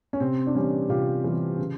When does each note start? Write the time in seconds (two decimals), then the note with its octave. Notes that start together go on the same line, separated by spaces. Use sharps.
0.13 C#4
0.20 C3 C4
0.46 D4
0.55 E3 G3 B3 C#4
0.89 C3 F4 G4
1.24 E3 G3 B3
1.58 C#3